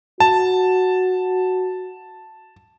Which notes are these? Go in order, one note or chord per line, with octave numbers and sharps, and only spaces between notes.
F#4 A5